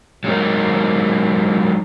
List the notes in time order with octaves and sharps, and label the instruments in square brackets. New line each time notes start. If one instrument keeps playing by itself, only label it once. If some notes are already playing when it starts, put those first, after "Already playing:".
[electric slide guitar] F#3 G#3 D#4 A#4